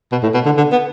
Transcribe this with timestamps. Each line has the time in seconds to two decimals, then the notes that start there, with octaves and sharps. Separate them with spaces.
0.12 B2
0.23 A2
0.34 B2
0.45 D3
0.57 D3
0.72 B3